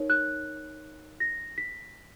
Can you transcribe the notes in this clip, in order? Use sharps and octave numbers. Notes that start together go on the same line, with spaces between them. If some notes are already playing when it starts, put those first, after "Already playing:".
Already playing: D#4 A#4 C#5
F#6
A#6
B6